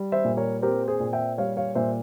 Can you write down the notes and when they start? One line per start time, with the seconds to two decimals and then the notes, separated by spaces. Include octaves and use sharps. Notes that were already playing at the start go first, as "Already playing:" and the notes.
Already playing: G3
0.12 C5 E5
0.24 A#2
0.37 A#4 C#5
0.62 C4 G4 A#4
0.87 G#4 C5
1.00 A#2
1.13 E5 G5
1.38 G3 C#5 F5
1.57 C#5 F5
1.75 A#2 C5 E5